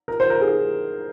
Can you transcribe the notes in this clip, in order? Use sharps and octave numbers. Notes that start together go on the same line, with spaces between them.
A#4
C5
A#4
G#4